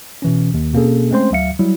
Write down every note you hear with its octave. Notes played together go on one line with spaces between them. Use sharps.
B2 E3 C#4
D#2
B2 A#3 C4 C#4 G#4 A4
G#3 A3 C4 C#4 C5 C6
D2 F#3 E5 F5 C#7
F#3 G3 E4